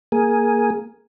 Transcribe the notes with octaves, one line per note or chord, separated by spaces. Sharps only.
A#3 G#4